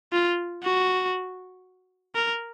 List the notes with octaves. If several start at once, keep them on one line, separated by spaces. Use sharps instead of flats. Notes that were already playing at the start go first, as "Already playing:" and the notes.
F4
F#4
A#4